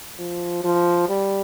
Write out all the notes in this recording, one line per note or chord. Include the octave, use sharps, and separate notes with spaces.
F3
F3
G3